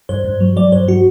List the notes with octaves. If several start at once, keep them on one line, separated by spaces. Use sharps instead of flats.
G2 C5
G2
F#3
F#3 D5
G2 C5
F#3 F#4